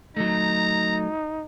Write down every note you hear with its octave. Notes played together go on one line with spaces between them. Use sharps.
F#3 A3 D#4 A#5